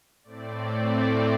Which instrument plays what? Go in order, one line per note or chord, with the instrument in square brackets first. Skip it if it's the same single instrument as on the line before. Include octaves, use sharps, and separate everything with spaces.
[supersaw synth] A2 A3 C4 D5